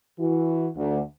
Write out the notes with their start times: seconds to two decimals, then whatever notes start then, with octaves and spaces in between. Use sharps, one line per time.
0.19 E3 E4 F#4
0.76 D2